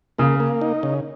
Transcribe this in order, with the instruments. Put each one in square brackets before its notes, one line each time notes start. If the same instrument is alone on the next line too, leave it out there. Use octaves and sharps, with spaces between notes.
[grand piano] C#3 [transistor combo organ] A#3
[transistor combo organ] A#3
D#4
C#3